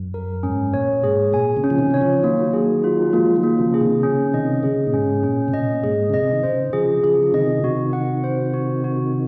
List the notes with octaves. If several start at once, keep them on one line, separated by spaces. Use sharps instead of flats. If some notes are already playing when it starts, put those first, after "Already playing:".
Already playing: F#2
A#4
G#2 C#4
A#2 C#5
A#2
G#2 G#4
A#2 G#5
C#3
C#4
F3
C3 D#3
D#3 C#5
C#3 F3
D#3 F#3 A#3
G#4
F4
F3 G#3 A#3
D#3 F#3
A#3
C#3 F3
G#4
C3 D#3
C#3 C#4
C3 D#3 D#5
C#3 G#4
A#2
G#2 C#4
A#2 C#4
C3
A#2 D#5
G#2 G#4
C#3
C3 D#5
D#3
C#3 C5
C#3 F3 G#4
C#3 F3 G#4
F3
C3 D#3 D#5
C3 D#3 F#4
F#5
C5
F#4
F#4